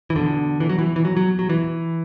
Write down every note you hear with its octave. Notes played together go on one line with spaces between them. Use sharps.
E3
E2 B2 D3
E3
F#3
E3
E3
F#3
F#3
F#3
E3